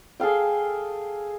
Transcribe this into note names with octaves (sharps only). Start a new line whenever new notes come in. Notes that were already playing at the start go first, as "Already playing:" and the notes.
G#4 A4 F5 G5